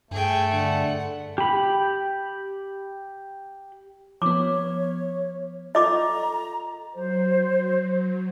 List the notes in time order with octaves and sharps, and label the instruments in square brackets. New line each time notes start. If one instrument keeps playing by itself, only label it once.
[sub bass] G2 [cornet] A3 [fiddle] G#4 G5
[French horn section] D3 [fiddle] F#5
[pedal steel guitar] G4 B5
[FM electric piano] F3 B3 [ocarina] C#5 [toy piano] D6
[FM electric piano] F4 A4 [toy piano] D#5 D6 [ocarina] A#5
[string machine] F#3 [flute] C5